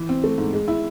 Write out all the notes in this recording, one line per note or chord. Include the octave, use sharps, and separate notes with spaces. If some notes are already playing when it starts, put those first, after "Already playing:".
Already playing: E3
C4
A3
G#2
G#3
E4